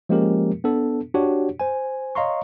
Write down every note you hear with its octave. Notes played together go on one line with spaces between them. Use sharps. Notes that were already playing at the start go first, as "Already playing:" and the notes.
F3 G#3 A#3 C#4 G4 A#4
B3 D4 A4
D4 F#4 G4 C#5
C5 G#5
C#5 D#5 F5 A#5 C6 C#6